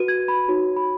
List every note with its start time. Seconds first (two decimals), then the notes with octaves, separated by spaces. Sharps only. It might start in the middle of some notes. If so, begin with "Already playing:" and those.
Already playing: F#4 B4 D#7
0.08 G#6
0.28 B5
0.48 D#4 F#4 C#5
0.76 B5